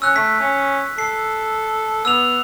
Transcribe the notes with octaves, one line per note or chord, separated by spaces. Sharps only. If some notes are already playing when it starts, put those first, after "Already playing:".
C#4 E6 F#6
A3 B6
C#4
A4 C7
B3 E6 F7